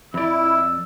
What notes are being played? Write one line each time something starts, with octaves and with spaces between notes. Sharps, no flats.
F2 E4 D5 E6